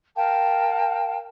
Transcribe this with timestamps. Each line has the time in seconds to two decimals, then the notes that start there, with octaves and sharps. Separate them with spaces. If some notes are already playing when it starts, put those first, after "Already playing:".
0.16 A#4 F5 G5 A5